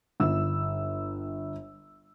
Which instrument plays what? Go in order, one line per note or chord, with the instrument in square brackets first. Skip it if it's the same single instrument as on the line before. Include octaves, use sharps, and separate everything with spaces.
[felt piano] G1 E6